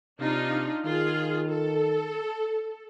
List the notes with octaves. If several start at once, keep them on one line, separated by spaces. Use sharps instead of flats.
C3 D4 D#4 F4
D#3 F4 G#4
A4